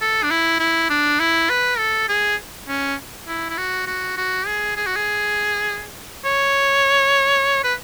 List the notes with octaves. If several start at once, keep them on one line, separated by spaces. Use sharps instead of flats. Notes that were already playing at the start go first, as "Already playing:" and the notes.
A4
D4
E4
E4
D4
E4
B4
A4
G#4
C#4
E4
E4
F#4
F#4
F#4
G#4
G#4
F#4
G#4
C#5
B4